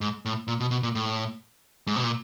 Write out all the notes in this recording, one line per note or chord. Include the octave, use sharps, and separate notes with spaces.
G#2
A2
A#2
B2
B2
A#2
A2
G#2
B2
A#2